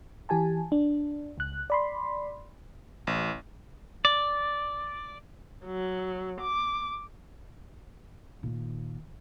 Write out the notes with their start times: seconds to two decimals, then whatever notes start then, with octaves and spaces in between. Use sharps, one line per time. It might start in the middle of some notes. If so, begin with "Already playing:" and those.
0.29 E3 G4 G#5 A5
0.72 D4
1.38 C#2 F#6
1.70 D5 B5 C6
3.07 A1
4.05 D5
5.67 F#3
6.40 D6
8.43 A#2 D#3